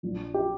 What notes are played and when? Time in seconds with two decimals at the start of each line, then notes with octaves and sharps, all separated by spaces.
0.03 A#1 A#2 F3
0.34 G4